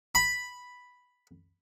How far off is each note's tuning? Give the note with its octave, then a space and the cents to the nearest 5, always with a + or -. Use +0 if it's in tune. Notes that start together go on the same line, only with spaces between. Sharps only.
B5 +0